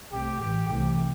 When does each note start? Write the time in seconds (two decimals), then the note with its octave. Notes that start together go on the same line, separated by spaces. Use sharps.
0.12 C2 C3 A3 G4
0.40 A1 G2 E3 G4
0.69 C2 C3 E3 A3 G4